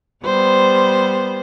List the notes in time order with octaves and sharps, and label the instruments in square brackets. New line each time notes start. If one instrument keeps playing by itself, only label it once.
[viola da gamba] G3 B3 C5